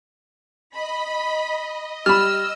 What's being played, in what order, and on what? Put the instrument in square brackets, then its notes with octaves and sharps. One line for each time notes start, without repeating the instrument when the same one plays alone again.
[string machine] D#5 [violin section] B5
[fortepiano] G3 B5 [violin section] E6 [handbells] F6